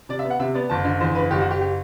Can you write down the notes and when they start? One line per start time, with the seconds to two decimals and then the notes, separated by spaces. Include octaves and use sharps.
0.09 C3 D5
0.19 E5
0.25 B3
0.30 F#5
0.39 C3 E5
0.54 B3 D5
0.70 F#1 A5
0.85 D3
1.01 E2 C5
1.15 F#1 B4
1.31 F#1 G4
1.40 F#4
1.47 F#1 G4
1.61 G4